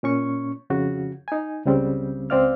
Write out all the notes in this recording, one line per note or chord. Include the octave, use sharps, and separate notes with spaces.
A#2 C#4 C#6
F2 C#3 F#4
D#4 G#5
C#2 C#3 G3 C4
C#2 C4 C5 D5 F5 F6